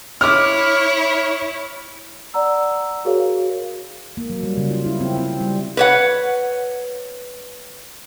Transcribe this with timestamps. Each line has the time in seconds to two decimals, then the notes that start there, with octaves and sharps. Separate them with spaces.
0.21 E4 C#5 D6 F6
2.34 D5 F#5 A#5 E6
3.05 F#4 G#4 A#4 C#5 F5
4.17 A#3
4.30 F#3
4.43 G3
4.57 C#3
4.71 F4
4.86 E4
5.00 C4
5.17 C4
5.40 G3
5.77 B4 C#5 F#5